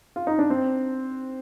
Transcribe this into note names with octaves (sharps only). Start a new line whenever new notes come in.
F4
D#4
D4
C4